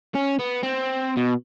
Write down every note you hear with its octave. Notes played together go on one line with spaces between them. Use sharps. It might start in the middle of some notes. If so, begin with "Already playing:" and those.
C#4
B3
C4
B2